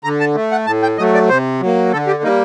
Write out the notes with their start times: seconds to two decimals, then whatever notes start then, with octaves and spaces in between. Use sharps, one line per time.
0.04 D3 A#5
0.20 A5
0.35 A3
0.52 F#5
0.66 A2 A5
0.83 G5
0.98 F#3 A3 D#5
1.14 D5
1.29 C3 C5
1.61 F#3 A#3
1.92 D3 A4
2.07 G4
2.23 G3 A#3 D#4